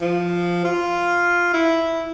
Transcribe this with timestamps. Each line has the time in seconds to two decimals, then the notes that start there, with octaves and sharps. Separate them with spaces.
0.01 F3
0.65 F4
1.53 E4